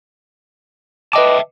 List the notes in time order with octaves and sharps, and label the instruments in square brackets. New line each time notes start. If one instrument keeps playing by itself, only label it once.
[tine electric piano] B4 D#5 D6 [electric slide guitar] E5 G5 A5